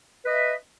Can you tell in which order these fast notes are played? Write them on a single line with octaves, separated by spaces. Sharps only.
B4 D#5 E5